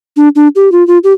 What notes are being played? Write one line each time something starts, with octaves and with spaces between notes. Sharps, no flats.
D4
D4
G4
F4
F4
G4